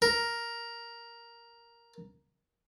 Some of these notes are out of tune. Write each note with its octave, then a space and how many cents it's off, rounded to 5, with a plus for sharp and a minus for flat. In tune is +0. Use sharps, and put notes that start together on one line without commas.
A#4 +5